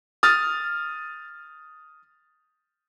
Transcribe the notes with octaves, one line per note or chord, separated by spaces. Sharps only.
D#6 F6 A6